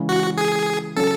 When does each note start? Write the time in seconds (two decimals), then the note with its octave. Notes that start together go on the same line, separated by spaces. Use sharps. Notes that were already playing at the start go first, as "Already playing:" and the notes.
Already playing: C#3 E3 G#3 C#4
0.09 F#4
0.37 G#4
0.96 C#3 F#3 C#4 A4